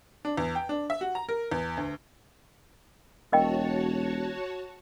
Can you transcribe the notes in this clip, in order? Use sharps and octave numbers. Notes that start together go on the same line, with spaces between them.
D4
E2
G5
D4
E5
F#4
A#5
A#4
E2
D2
E1 F#4 A#4 C#5 D#5 G5 A5